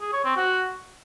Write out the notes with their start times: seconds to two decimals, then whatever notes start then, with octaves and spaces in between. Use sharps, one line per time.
0.01 G#4
0.13 C#5
0.25 C4
0.37 F#4